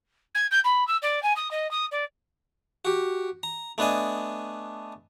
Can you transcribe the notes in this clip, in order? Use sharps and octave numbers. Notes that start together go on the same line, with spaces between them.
G#6
G6
B5
E6
D5
G#5
D#6
D#5
D#6
D5
F#4 G4
A#5
A3 B3 D4 D#5 G#5